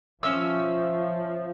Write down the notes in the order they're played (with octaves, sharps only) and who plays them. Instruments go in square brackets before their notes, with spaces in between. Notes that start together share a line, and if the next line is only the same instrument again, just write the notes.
[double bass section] F3 [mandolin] C#4 E5 E6